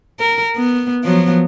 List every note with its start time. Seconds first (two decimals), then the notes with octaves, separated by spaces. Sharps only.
0.19 A#4
0.56 B3
1.04 F3 F#3 B3